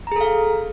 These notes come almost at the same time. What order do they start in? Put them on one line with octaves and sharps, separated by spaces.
A#5 G#4 A4 F5